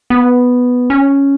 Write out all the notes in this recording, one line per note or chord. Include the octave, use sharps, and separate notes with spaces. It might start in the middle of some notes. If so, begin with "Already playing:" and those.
B3
C#4